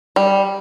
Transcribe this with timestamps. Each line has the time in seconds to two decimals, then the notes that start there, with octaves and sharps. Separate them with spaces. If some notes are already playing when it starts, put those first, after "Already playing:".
0.16 G3